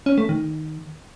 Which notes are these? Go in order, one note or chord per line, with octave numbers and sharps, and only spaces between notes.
C#4
A3
D#3